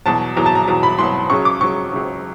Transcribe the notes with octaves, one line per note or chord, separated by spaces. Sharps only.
E2 B2 F#3 A5
E2 B2 F#3 A#5
A5
A#5
E2 B2 F#3 A#5
B5
E2 B2 F#3 C6
C#2 C#3 F#3 C#6
D6
C#2 C#3 F#3 C#6
C#2 C#3 F#3